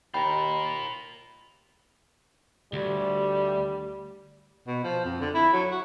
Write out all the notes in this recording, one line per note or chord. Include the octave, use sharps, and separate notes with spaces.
D#2 F4 A#4 G5 A#5 B5
D2 G3
B2
F3
F2
D3
E4
F#3
F#4